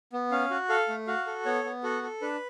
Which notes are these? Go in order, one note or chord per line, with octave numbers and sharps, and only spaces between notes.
B3
C#4 F5
F#4
A4 F5
A3
F#4 F5
A4
B3 C#5
B3
F#4 A4
A4
D4 B4